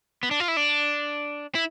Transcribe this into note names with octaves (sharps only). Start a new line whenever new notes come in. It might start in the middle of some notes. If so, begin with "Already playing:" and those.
B3
D4
F4
E4
D4
E4